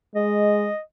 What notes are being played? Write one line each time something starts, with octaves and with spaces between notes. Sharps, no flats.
G#3 D#5